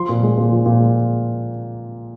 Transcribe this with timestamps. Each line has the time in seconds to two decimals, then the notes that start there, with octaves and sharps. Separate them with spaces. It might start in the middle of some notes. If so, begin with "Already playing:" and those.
Already playing: F3 C6
0.09 A#2
0.23 G#3
0.37 A#2
0.52 F3
0.66 A#2
0.80 G#3